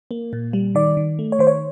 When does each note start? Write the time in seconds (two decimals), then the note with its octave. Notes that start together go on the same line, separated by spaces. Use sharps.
0.11 A#3
0.33 A#2
0.53 G3
0.75 D#3 D5
0.97 D#3
1.19 A3
1.32 C#5
1.39 D#3 C5
1.47 C#5